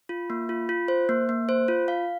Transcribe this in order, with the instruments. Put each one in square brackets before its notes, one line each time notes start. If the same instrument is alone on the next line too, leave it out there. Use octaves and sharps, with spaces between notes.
[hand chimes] F4
A#3
F4
F4
C5
A#3
A#3
C5
F4
F5